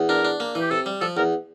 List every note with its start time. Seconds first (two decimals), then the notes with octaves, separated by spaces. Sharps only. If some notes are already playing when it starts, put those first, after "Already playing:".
Already playing: E2
0.09 D4 A#4
0.25 D4
0.40 A#3
0.55 E3
0.61 G4
0.71 C3 A4
0.86 G3
1.01 F3 A4
1.17 E2 A#4